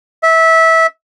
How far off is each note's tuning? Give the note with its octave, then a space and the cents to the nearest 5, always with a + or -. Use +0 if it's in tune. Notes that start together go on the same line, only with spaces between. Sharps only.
E5 -20